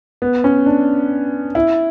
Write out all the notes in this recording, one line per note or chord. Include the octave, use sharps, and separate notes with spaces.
B3
C#4
D4
E4